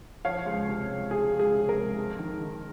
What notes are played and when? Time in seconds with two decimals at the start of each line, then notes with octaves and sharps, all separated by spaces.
0.24 F3 C#5 F5
0.46 C#2
0.68 C3
0.89 C#2
1.11 F3 G#4
1.33 C#2
1.40 G#4
1.54 C3
1.69 A#4
1.76 C#2
1.97 F2
2.19 D#3
2.41 D#3